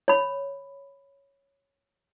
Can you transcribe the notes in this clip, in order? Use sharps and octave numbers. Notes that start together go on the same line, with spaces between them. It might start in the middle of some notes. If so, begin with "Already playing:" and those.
C#5 B5